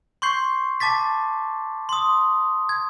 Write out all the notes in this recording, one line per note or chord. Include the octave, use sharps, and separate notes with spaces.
C6 C#6 G6 C7
A5 D6 A6 B6
C6 D#6
G#6